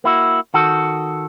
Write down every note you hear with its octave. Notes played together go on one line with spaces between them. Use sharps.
A#3 E4 F#4
D#3 F#4 A4